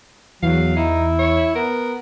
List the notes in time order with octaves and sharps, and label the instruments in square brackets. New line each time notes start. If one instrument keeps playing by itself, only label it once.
[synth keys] E2 [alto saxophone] F#3 [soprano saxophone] F5
[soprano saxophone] D#4 [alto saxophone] E4
[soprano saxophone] C#5
[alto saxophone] B3 [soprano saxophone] A#4